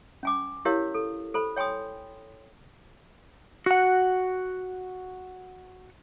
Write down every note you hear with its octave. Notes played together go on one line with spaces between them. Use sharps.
C#4 G#5 D6
E4 G4 A#4 C#5 F5
A4
A4 C5 B5
C#5 G5 G#5 C6 D#6
F#4 F#5